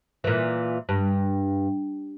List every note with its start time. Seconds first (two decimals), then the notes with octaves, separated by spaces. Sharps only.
0.24 A#2 E3
0.89 G2